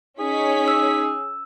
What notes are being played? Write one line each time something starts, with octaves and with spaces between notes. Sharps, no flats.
C#4 D#4 G#4 B6
E6